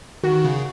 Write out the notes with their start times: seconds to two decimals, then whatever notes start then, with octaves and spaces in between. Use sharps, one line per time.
0.23 D#3 F#4
0.45 C#3